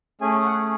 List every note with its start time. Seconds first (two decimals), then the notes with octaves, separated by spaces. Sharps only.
0.21 A3 C#4 G#4 G#5
0.45 F#5